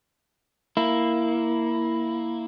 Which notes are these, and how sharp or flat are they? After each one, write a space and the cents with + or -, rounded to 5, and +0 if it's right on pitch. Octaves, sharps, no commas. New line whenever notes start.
A#3 +0 E4 +0